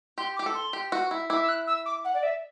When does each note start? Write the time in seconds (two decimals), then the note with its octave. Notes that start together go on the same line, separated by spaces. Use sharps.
0.18 G4 C6
0.36 D6
0.39 G4
0.46 A4
0.55 C6
0.73 G4
0.92 F#4
1.11 E4
1.29 E4 D6
1.42 E6
1.48 F#6
1.67 E6
1.85 D6
2.04 F#5
2.14 D5
2.23 E5